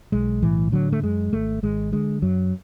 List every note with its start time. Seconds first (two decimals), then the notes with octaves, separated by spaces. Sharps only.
0.12 B1 G#3
0.42 A2 E3
0.72 D3 F#3
0.92 A3
1.02 F#2 G#3
1.33 G#1 A3
1.63 G#1 G#3
1.92 D3 G#3
2.22 F#2 F#3